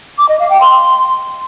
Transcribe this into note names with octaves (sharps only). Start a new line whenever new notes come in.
D6
D#5
F5
G5
C6